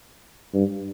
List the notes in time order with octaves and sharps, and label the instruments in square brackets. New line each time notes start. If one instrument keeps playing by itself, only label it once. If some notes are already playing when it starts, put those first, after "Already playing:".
[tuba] G2